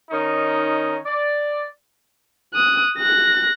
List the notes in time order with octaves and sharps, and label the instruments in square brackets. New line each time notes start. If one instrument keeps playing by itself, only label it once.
[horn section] D#3 C#4 D#4
D5
[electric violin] D#6 F#6
F#6 A#6